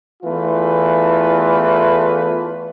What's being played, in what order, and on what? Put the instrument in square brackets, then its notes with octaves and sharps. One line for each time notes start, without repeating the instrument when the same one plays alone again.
[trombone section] E2 E3 A3 F4 B4